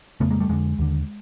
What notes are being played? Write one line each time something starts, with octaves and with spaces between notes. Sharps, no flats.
F2 C#3 A3 B3
G#3 A#3
G3 A3
F2 D3 F#3 G#3
D#2 D3